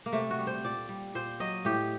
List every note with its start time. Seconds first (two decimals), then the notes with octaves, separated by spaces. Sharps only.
0.06 A#3
0.13 C3 A3
0.31 F#4
0.39 G3
0.47 C5
0.64 A#2 D5
0.89 G3
1.15 A#2 C5
1.40 F#3 D#5
1.65 A2 G4